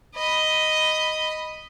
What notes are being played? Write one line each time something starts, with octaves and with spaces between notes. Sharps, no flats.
D#5 B5